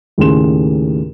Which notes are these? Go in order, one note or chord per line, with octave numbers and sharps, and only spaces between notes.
D#2 A2 C#3 G#4 C6 E7